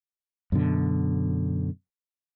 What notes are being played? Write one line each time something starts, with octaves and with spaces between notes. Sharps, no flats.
F#2 B2 D3